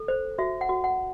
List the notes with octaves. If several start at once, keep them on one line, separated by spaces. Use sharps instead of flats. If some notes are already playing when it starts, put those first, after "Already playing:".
Already playing: A4
C5
F#4 E5
F#5
F#4
F#5